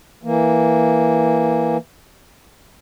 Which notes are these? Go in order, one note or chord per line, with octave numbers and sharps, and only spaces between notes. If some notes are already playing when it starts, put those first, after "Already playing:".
E3 A#3